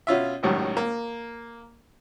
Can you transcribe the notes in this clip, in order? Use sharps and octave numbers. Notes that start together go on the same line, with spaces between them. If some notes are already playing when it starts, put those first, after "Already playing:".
B2 C#4 F4 E5
G#1 C#2 F#2 A2 D#3 G3
A#3